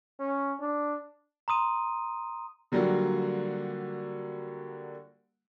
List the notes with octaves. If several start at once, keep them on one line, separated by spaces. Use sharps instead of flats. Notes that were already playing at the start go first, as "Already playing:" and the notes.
C#4
D4
A#5 C6 D#6 D#7
D3 F#3 G3 A#3 F4 F#4